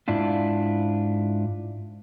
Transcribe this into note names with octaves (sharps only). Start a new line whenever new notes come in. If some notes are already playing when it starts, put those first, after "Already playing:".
G#2 D4 E4 F4